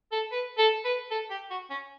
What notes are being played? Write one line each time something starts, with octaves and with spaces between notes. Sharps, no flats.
A4
B4
A4
B4
A4
G4
F#4
C#4